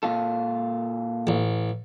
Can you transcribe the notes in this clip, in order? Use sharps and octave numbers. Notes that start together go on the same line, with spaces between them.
A#2 F4 A4
A1